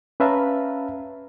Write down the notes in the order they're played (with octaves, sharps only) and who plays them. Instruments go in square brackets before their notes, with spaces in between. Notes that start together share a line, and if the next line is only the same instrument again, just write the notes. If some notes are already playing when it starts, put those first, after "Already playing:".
[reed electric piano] C#4 B4 E5 F5 A5 A#5